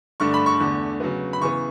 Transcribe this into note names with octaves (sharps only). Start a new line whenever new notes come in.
G2 D3 A3 D4 C#6
B5
C#6
E2 D3 A3
C#3 F#3 B3
B5
C#3 E3 B3 C#6